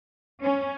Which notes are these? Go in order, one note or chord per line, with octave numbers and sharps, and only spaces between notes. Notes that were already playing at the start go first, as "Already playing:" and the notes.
C#4